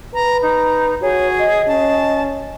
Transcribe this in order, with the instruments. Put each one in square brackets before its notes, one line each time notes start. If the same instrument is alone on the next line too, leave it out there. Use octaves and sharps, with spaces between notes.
[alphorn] B4 [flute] A#5
[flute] D#4 [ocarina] A#5
[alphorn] F#4 [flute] G#4 [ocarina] C#5
[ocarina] D#5
[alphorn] C#4 [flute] A5